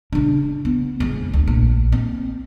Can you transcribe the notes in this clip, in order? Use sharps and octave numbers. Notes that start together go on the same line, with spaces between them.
C#3 D4
B3
F2 G#3
D2
A#1
C4